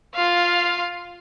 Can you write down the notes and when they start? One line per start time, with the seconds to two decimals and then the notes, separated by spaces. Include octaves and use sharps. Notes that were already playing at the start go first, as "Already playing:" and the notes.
0.16 F4 F5